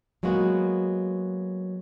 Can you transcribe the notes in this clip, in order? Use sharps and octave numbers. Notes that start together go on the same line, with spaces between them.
F#3 G#3 A#3 B3 F#4